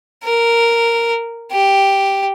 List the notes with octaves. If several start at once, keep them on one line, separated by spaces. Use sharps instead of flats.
A#4
G4